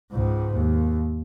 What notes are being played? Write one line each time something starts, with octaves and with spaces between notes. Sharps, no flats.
C#2 G#2
D#2